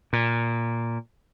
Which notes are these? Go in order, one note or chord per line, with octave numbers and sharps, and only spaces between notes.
A#2